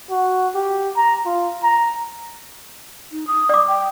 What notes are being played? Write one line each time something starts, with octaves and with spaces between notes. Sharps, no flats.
F#4
G4
A#5
F4
A#5
D#4
D#6
D5 D6
G5